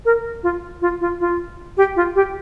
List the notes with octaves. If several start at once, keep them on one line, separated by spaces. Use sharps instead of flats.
A#4
F4
F4
F4
F4
G4
F4
G4